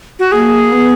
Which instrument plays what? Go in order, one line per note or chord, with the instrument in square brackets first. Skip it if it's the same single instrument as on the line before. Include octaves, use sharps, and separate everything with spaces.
[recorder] F#4
[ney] A#3 [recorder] G#4
[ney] B3